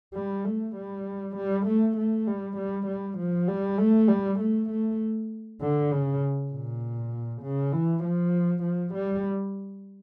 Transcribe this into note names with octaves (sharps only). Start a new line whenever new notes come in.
G3
A3
G3
G3
A3
A3
G3
G3
G3
F3
G3
A3
G3
A3
A3
D3
C#3
A#2
C#3
E3
F3
F3
G3